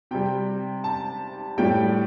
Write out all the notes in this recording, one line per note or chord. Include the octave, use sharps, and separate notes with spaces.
C3 G3 G5
A5
A2 G3 G5